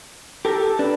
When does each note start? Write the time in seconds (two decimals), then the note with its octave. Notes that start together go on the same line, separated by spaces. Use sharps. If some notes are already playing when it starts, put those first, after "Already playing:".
0.45 G4 A4 A#4
0.79 D4 B4